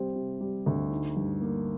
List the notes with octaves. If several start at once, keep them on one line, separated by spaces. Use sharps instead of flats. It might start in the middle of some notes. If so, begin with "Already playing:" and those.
Already playing: C3 G3 C4
C3
G3
D2
D#4
G2
A#3